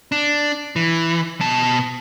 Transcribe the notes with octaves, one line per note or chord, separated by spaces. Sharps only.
D4
E3
B2 A5